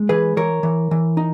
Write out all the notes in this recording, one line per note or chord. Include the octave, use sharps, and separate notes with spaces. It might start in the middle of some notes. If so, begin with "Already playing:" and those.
Already playing: G#3
E3 G#4 B4
E3 A#4 C#5
E3
E3
D#4